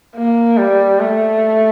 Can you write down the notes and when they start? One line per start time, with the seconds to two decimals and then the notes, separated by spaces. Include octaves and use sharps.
0.16 A#3
0.57 G3
0.99 A3